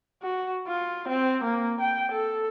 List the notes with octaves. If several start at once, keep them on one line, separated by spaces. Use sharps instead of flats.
F#4
F4
C4
A#3
G5
A4